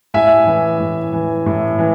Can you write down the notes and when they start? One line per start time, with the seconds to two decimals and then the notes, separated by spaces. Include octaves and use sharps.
0.14 A2 E5 G#5
0.47 E3
0.80 A2
1.13 E3
1.46 A2
1.79 E3